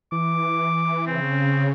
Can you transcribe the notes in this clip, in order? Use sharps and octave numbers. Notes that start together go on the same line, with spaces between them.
E3 D6
C#3 C4